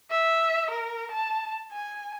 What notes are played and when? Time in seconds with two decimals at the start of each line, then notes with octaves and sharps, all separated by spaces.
0.11 E5
0.71 A#4
1.11 A5
1.72 G#5